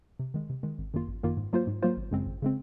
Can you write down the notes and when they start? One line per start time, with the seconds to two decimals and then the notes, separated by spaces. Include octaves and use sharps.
0.19 C3
0.34 D#3 G#3
0.50 C3
0.63 D#3 G#3
0.78 G#1
0.94 F#2 D#3 A#3 F4
1.08 G#1
1.23 F#2 D#3 A#3 F4
1.37 G#2
1.53 F#3 A#3 F4 C5
1.67 G#2
1.82 F#3 A#3 F4 C5
1.97 G#1
2.11 F#2 C#3 G#3 C4
2.26 G#1
2.42 C#3 G#3 C4